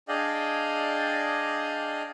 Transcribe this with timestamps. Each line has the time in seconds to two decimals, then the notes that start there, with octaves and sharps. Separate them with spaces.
0.08 D4 G#4 D5 D#5 F5 G5